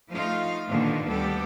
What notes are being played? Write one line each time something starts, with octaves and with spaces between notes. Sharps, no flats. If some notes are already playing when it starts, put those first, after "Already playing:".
F3 A3 D#4 F4 F5
A#2 D3 D#3 F3 A#3 B3
D2 G3 B3 G4 A4